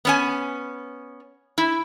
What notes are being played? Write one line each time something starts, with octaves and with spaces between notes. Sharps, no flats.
B3 C#4 G#5
E4